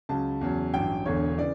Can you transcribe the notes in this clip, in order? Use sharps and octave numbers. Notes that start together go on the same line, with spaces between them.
C#2 C#3 F#3 A5
E2 C#3 F#3
A1 G2 F#3 G5
E1 E2 D3 C#5
C#3 E3 D5